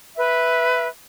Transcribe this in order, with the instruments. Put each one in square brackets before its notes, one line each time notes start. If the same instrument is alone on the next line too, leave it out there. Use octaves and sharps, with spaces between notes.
[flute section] B4 E5